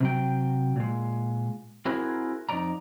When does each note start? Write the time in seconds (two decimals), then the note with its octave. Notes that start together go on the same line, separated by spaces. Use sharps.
0.01 C3 F#3 G5
0.76 A#2 G#3
1.85 C4 E4 F#4 G#4 A#4
2.49 F2 D#4 D5 A#5